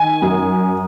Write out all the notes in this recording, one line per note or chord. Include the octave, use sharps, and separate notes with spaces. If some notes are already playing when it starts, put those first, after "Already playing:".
Already playing: D#3 G#5
F#2